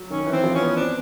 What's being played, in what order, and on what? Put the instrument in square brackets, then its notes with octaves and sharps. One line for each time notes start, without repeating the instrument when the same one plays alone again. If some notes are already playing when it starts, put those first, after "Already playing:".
Already playing: [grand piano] F#3
[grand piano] D#3 [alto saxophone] C#4
[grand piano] E3
[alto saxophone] C4
[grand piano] F3
[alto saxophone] C#4
[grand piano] B3
[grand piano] C4 [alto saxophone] D4